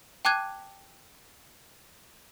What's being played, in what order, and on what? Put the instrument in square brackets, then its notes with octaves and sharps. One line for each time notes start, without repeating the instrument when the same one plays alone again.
[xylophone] G5 A5 D6 F#6 G#6 D#7